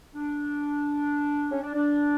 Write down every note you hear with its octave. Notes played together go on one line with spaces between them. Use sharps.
D4
C#4
D4
D4